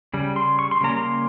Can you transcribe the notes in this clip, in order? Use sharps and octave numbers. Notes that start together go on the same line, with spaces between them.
C#3 G3
C6
C#6
C6
C#3 G3 A#3 C#4 A#5
C6